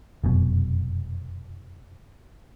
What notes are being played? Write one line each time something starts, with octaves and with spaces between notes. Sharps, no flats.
F1 F#2 B2